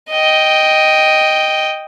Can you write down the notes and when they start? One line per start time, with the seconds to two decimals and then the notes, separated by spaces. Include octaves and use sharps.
0.11 D#5 G5